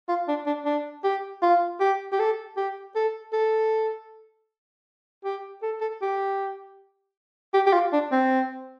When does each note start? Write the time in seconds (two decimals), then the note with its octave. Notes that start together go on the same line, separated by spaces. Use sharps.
0.09 F4
0.28 D4
0.47 D4
0.65 D4
1.04 G4
1.42 F4
1.80 G4
2.12 G4
2.19 A4
2.57 G4
2.95 A4
3.33 A4
5.25 G4
5.63 A4
5.81 A4
6.02 G4
7.54 G4
7.66 G4
7.73 F4
7.93 D4
8.12 C4